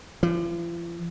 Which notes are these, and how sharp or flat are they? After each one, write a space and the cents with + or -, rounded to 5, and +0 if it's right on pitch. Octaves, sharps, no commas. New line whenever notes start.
F3 -45